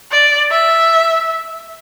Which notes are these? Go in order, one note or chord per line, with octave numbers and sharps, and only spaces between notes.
D5
E5